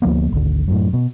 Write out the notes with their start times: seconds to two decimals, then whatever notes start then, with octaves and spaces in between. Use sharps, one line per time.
0.02 D2 F3 A#3 B3
0.32 G#1 D2
0.68 F#2 A2
0.93 B2